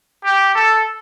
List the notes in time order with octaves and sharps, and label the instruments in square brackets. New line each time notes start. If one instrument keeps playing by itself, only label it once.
[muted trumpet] G4
A4